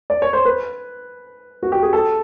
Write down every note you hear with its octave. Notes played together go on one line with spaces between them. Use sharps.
D5
C#5
C5
B4
F#4
G4
G#4
A4